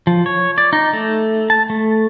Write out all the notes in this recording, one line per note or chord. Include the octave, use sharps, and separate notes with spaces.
F3
C#5
D5
D#4
A3
A5
A3